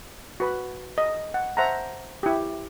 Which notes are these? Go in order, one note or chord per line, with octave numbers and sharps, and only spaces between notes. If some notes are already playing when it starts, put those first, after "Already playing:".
F#4 B4 B5
D#5
F#5
C5 E5 F#5 A5 A#5
E4 G4